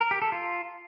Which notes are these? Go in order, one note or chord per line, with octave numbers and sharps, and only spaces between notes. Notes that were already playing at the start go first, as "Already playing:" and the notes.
A#4
G4
A4
F4